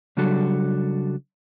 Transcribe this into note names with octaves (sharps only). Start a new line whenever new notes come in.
C#3 F#3 G3 D4 F#4 A4